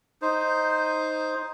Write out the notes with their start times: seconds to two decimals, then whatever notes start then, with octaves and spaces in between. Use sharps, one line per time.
0.22 D#4 C5